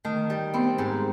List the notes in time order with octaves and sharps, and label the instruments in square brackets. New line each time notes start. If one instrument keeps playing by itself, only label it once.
[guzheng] D#3 [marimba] A3
[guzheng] G3
[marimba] B3 [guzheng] C4
[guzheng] G#2